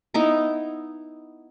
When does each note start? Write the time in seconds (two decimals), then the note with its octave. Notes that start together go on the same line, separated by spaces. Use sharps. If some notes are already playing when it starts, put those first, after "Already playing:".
0.14 B3 D#4 E4 A#5